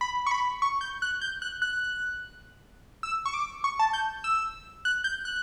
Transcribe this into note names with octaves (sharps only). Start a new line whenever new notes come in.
B5
C#6
B5
C#6
G6
F#6
G6
F#6
F#6
E6
C#6
D6
C#6
A5
G6
E6
F#6
G6
F#6